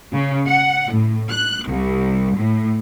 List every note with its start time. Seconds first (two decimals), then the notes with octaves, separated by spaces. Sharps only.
0.14 C#3
0.49 F#5
0.93 A2
1.30 F#6
1.68 C2
2.38 A2